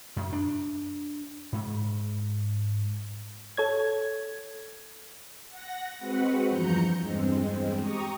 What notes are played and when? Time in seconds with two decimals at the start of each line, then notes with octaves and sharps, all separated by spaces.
0.16 F#2
0.33 D4
1.53 G#2
3.57 A4 C#5 G#6
5.49 F#5 A#6
5.98 G#3 C4 F#4 B4 F#5
6.48 E2 G2 F3 A#5 G6 C#7
6.97 E2 G2 G#3 C4
7.79 G4 A#5 C#6 D#6